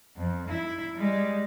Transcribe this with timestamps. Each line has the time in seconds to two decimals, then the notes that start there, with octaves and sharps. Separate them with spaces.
0.17 F2
0.49 E4
0.94 G3 G#3